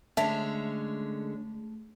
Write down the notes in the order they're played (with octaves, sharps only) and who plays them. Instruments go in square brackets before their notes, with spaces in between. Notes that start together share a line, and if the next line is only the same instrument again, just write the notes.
[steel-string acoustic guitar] D3 G#3 C#4 [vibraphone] A3 [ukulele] E5 A5